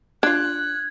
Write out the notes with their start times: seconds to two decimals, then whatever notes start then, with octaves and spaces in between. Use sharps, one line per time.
0.23 D4 F4 F#6 G#6